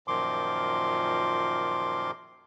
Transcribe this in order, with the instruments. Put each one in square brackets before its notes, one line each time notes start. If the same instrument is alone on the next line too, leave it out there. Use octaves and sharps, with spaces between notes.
[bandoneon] F#2 A#2 D#3 F3 C6 D6